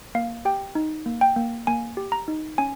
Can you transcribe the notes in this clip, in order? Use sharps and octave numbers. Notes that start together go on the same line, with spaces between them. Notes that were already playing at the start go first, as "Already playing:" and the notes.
A#3 F5
G4 G5
D#4
A#3
G5
A#3
A#3 G#5
G4
A#5
D#4
C#4 G#5